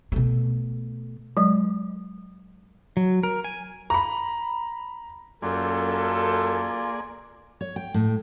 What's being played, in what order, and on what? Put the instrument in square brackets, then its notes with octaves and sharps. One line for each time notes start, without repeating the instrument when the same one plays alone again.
[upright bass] B2 A3
[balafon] F#3 G#3
[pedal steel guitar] F#3
A#4
G#5
[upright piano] A#5 B5
[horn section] F#2 A4 [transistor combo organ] A#3 G#4 D5 [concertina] F4
[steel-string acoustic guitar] C#5
G5
A2